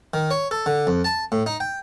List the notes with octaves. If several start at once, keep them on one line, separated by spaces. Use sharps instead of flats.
D#3
C#5
A4
D3
F2
A5
A2
D#4
G5